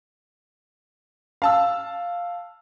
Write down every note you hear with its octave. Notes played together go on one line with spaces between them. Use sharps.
F5 A5 E6